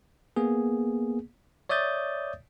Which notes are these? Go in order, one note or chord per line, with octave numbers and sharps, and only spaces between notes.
A#3 B3 G#4
C#5 D5 E5 D#6 G6 A6